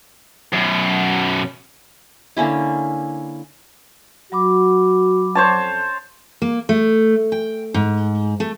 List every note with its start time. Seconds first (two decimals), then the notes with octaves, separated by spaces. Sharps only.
0.53 F#2 B2
2.37 D3 A#3 C#4 E4
4.32 F#3 F#4 B5 D6
5.35 F2 C5 C#5 A5
6.42 A#3
6.69 A3
7.32 G5
7.74 G#2
8.40 A3